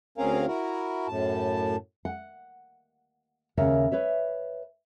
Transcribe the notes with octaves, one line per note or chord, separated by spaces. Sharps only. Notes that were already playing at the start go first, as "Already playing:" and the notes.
D2 C4 C#4 G#4 A#4 F5
E4 F#4 A#4
F#2 A2 A5
F#5
D#2 C#3 A#4 E5 F#5
B4 C#5 E5